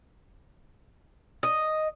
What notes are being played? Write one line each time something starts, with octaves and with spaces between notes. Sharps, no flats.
D#5